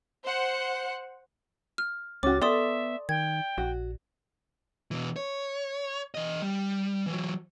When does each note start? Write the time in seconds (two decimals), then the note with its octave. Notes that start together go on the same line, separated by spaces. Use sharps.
0.23 C5 F#5
1.78 F6
2.23 C#2 C#4 F#4 D6 A6
2.42 B3 A4 D5 E5 C6 D#6
3.09 D#3 G5 G#6
3.58 A#1 F#4
4.91 B2 E3
5.16 C#5
6.15 E3 D#5
6.42 G3
7.06 E3 F#3